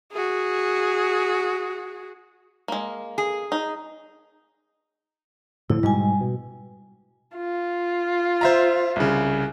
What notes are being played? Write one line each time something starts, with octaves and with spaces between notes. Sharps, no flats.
F#4 G#4
G#3 A#3
G#4
D#4
A2 D3 F3 E4
G#2 B2 G3 G#3 G#5
B2
F4
C5 E5 A#5
C2 C#3